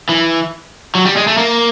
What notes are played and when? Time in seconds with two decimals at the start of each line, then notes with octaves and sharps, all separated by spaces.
0.09 E3
0.95 F#3
1.05 G3
1.16 G#3
1.27 A3
1.38 A#3